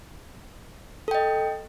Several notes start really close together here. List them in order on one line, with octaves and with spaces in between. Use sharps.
A4 G5 D#5